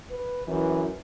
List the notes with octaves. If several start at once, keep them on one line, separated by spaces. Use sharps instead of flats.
B4
F#2 E3